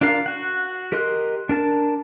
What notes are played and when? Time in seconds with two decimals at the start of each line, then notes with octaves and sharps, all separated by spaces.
0.01 D4 F4 A#4 F5
0.26 F#4 F#5
0.92 G4 A#4 D#5 C6 F#6
1.49 D4 A#4 A5